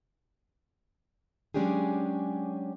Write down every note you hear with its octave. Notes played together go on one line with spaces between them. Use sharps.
F#3 G#3 C#4 D4 G4 G#4